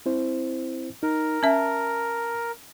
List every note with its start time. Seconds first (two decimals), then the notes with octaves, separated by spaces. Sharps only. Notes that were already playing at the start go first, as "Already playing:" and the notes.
0.06 C4 E4 C5
1.03 D#4 A#4
1.43 C#4 E5 A5